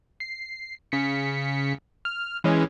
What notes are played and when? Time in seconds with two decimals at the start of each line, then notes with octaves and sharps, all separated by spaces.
0.20 C7
0.92 C#3 B6 C#7
2.05 F6
2.44 E3 G#3 C#4